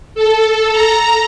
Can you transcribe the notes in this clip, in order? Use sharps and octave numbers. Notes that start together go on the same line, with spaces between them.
A4
A#5